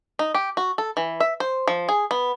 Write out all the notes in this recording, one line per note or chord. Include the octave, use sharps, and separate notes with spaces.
D#4
G4
F#4
A4
E3
E5
C5
F3
G#4
B3